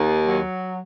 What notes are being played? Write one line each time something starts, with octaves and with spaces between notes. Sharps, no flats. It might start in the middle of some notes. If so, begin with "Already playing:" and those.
Already playing: D#2
F#3